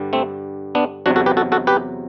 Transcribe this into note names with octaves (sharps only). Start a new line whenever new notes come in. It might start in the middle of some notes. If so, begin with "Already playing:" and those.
Already playing: G2 D3 G3
A3 C4
B3 D4
E2 C3 F#3 D4 F#4
F#4 A4
G4 B4
F#4 A4
F#4 A4
G4 B4